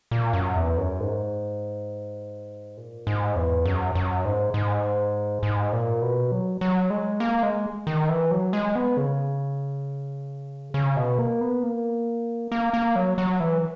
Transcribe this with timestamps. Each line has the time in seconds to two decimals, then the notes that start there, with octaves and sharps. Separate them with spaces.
0.11 A#2
0.33 F#2
0.56 E2
0.77 F#2
1.00 G#2
2.77 A#2
3.07 G#2
3.36 E2
3.65 F#2
3.95 F#2
4.25 G#2
4.54 G#2
5.43 G#2
5.73 A#2
6.02 B2
6.32 F#3
6.61 F#3
6.90 G#3
7.20 A#3
7.43 G#3
7.87 D#3
8.09 E3
8.31 F#3
8.53 G#3
8.75 B3
8.97 C#3
10.74 C#3
10.97 B2
11.18 A#3
11.41 B3
11.63 A#3
12.52 A#3
12.73 A#3
12.96 F#3
13.18 F#3
13.40 E3